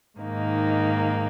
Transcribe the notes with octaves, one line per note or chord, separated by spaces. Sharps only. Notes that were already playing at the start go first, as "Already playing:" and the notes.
G#2 D#3 A#3 D#4